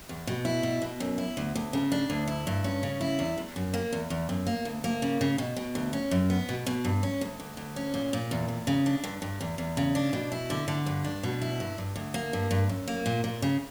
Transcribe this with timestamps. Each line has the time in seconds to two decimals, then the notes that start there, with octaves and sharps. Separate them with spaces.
0.09 E2
0.27 B2
0.45 E4
0.63 B2
0.82 B2
1.00 F#2
1.18 E4
1.37 D2
1.55 D2
1.73 C#3
1.92 D4
2.10 D2
2.27 E4
2.47 G2
2.64 C#4
2.83 C#3
3.01 E4
3.19 E2
3.38 E2
3.56 F#2
3.74 A#3
3.92 E2
4.10 E2
4.29 F#2
4.47 A#3
4.65 D2
4.84 A#3
5.02 C#3
5.21 C#3
5.38 B2
5.57 B2
5.75 D2
5.93 C#4
6.11 F#2
6.30 B3
6.49 B2
6.66 B2
6.85 G2
7.03 C#4
7.21 D2
7.40 D2
7.57 D2
7.76 C#4
7.94 A#2
8.13 A#2
8.31 E2
8.48 E2
8.67 C#3
8.86 D4
9.04 G2
9.22 G2
9.41 E2
9.58 E2
9.77 C#3
9.95 D4
10.13 B2
10.32 E4
10.50 D3
10.68 D3
10.86 G2
11.04 D4
11.23 B2
11.42 E4
11.60 G2
11.78 G2
11.96 D2
12.14 A#3
12.33 G2
12.51 G2
12.69 F#2
12.88 A#3
13.06 A#2
13.24 A#2
13.42 C#3